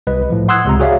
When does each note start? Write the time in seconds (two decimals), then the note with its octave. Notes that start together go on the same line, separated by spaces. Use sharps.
0.07 C2 B4 D#5
0.30 A2 F3
0.48 F#5 C6 D#6 E6 F#6 G#6
0.65 C#2 C3 A#5
0.80 F#4 G#4 C#5 D5 E5 F5